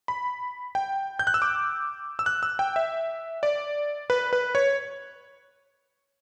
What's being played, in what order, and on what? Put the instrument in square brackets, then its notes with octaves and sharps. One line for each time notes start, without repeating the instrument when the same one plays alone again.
[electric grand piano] B5
G5
G6
F#6
E6
D6
E6
F#6
E6
G5
E5
D5
B4
B4
C#5